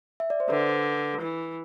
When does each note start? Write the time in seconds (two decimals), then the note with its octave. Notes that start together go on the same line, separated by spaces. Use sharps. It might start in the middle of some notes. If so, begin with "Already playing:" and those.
0.20 E5
0.30 D5
0.40 C5
0.50 D3 B4
1.21 E3